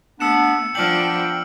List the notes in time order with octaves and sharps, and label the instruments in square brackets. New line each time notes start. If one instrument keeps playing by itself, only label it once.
[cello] A3 [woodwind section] B3 D4 [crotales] E6 C#7 E7
[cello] F3 D4 [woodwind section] B3 D5 G5 [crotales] F6 F#7